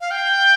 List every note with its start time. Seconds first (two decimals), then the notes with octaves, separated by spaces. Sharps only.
0.01 F5
0.11 G5